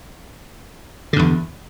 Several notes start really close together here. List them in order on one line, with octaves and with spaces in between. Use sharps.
D3 G2 E2